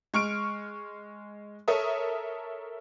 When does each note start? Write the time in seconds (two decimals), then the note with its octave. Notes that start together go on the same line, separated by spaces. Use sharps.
0.14 G#3 C#6 F6 D7
1.68 A4 A#4 C#5 E5 D#6